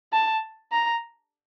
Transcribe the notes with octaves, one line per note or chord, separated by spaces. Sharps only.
A5
A#5